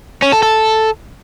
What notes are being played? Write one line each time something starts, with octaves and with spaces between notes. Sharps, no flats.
C#4
A4
A4